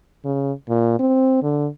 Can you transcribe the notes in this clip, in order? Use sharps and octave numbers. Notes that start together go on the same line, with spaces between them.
C#3
A#2
C4
D3